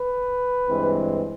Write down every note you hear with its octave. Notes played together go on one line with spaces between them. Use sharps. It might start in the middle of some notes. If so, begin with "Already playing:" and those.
Already playing: B4
G2 E3 G#3 C4